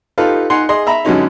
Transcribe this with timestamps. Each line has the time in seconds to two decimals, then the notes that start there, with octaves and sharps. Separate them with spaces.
0.18 D#4 F4 G4 A4 B4 F5
0.50 D#4 F#5 G#5 C6
0.69 G#4 D#5 C6
0.87 E5 A#5 B5
1.05 F#2 B2 D3 G#3 C#4 D#4